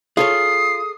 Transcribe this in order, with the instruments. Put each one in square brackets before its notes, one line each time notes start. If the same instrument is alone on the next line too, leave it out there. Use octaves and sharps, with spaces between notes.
[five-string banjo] F4 [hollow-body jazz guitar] G#4 A4 C#5 [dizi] D#6 [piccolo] C7